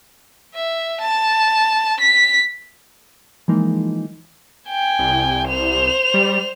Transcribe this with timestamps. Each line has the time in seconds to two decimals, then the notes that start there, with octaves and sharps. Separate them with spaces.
0.55 E5
1.01 A5
2.00 B6
3.48 E3 F3 G#3 A#3 D#4
4.69 G5 G#5
4.99 C2
5.47 C5 F7
6.14 G3